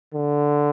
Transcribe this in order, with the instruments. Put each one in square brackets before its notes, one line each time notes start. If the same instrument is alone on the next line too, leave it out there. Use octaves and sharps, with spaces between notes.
[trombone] D3